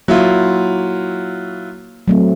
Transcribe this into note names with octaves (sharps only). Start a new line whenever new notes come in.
F#3 A#3 E4 F4
F#3 A3 C4